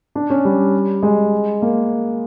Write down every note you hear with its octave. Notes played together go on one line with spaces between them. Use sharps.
D4
C#4
G3
G#3
A#3